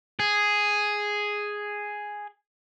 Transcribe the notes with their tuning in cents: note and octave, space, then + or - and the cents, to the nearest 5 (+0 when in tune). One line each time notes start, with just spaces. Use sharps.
G#4 +0